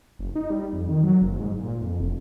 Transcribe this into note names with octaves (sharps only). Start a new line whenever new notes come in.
F#1
D#4
G3
F2
D#3
F#3
F#1
G#2
A#2
F2
F1